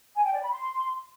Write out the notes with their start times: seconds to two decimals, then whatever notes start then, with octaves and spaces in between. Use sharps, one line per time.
0.15 G#5
0.24 G5
0.33 D5
0.42 B5
0.50 C6